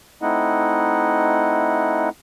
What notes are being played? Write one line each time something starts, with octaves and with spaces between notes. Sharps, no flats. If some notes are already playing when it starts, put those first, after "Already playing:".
A3 C4 D#4 E4 D#5 F#5